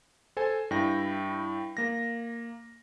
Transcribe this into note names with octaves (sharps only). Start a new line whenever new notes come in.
A4 C5 G#5
G2 E4 G5 A#6
A#3 A#6